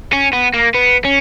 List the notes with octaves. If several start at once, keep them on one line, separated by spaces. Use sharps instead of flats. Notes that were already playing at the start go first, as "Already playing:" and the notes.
C#4
B3
A#3
B3
C#4